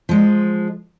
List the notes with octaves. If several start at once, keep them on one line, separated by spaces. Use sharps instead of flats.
F3 G#3